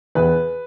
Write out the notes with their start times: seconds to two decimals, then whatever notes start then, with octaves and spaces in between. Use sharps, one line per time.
0.15 E2 B4